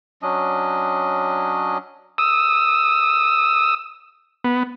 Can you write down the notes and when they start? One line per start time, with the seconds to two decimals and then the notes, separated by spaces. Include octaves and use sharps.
0.22 F#3 C#4 D4 D#5
2.18 D#6 E6
4.44 B3